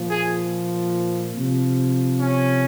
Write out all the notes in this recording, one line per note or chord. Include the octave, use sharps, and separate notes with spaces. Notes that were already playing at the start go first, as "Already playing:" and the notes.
Already playing: A#2 F3
G#4
C3 F3
C#4